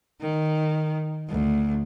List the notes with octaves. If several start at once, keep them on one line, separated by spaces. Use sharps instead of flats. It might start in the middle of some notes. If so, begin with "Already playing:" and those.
D#3
D2